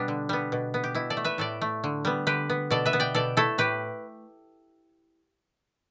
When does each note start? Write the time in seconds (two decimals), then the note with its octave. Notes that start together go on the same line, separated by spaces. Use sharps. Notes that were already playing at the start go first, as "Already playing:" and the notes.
Already playing: B2 G3 B3 D4
0.08 D3
0.29 G3 B3
0.52 B2
0.74 B3
0.84 G4
0.95 B2 E4
1.10 A4 D5
1.17 A3
1.24 B4 E5
1.38 A2 A4 D5
1.61 A3
1.84 D3
2.05 G3 B3
2.27 D3 G4 B4
2.50 B3
2.71 B2 A4 D5
2.85 B4 E5
2.93 B3
3.00 D5 G5
3.15 B2 A4 D5
3.37 A3 E4 A4
3.58 A2 G4 B4